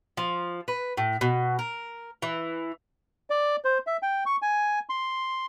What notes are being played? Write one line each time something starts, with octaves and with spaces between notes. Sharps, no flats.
F3
B4
A2
B2
A#4
E3
D5
C5
E5
G5
C#6
G#5
C6